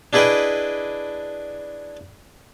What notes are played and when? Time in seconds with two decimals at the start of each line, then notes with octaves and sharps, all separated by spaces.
0.13 D4 E4 G#4 B4 D#5 G5